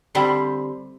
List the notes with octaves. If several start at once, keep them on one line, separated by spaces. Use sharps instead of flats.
D3 G3 C4 E4 G4